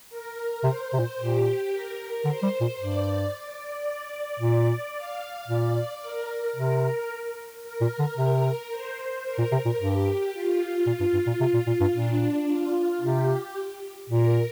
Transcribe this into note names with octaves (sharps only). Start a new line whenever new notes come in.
A#4
C3 C5
C3
A#2
A#2 G4
A#4
D3 C5
G3
A#2
G2 D5
D5
A#2 D5
F5
A#2 D5
A#4
C3 A#4
A#4
A#2
D3
C3
C5
A#4
A#2
C3
A#2
G2 G4
F4
A#2
G2
G2
A#2
C3
A#2
A#2
G2
A#2 D4
F4
C3 G4
A#2 A#4